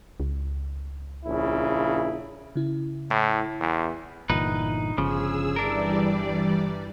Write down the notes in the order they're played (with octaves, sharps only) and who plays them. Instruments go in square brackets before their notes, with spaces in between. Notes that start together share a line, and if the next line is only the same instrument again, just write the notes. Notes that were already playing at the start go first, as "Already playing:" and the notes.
[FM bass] C#2
[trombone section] A#1 C#3 E4
[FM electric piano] C#3 E4
[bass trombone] A2
E2
[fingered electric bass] G1 A#2 E3 [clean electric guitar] D#4 B4
[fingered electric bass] G1 [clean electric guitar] C#3 F3 [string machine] G#4 E6
[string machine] E3 G3 D5 [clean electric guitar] D4 A#4